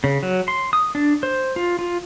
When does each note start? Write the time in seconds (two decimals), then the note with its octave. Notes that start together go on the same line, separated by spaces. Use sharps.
0.04 C#3
0.23 F#3
0.48 C6
0.73 D#6
0.95 D4
1.23 C5
1.56 F4
1.79 F4